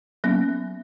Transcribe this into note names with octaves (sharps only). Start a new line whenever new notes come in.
F#3 A#3 B3 C#4